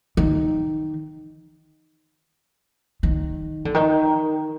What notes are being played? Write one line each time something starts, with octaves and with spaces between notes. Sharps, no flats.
D#3
D#3
D3
D#3